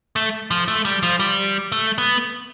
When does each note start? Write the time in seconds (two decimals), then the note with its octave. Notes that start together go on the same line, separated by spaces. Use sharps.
0.16 A3
0.51 F3
0.68 A3
0.85 G3
1.03 F3
1.20 G3
1.72 A3
1.98 B3